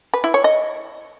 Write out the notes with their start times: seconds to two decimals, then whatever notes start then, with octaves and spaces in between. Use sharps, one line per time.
0.14 B4
0.24 E4
0.34 C#5
0.44 D#5